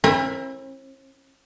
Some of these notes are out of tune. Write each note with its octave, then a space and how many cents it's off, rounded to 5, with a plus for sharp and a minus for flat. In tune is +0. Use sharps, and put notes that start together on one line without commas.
C4 +45 E4 +0 A#4 +30